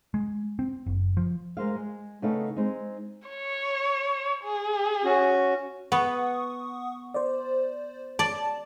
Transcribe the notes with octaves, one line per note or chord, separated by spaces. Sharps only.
G#3
C4
F#1
F3
G#3 A#4 C5 F5
G#3
C#3 A3 B3 D#4 A4 F5
G#3 C4 D#4
C#5
G#4
C#4 F#4
B3 F#5 C#6 D#6
C5 D5
D5 A5